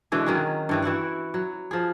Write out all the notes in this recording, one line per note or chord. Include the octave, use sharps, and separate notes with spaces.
B2 D3 E3 G#3
D#3 F#3 C#4 G#4
G2 E3 G3
E3 E4 F#4 F#5
F#3
F3 G#4